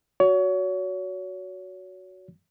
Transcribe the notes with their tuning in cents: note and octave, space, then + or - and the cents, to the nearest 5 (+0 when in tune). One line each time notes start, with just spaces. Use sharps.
F#4 +0 C#5 +30